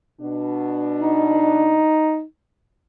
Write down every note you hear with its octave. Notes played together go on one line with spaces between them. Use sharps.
B2 D4
D#4